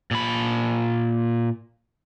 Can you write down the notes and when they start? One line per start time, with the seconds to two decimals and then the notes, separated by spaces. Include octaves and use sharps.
0.11 A#2 B5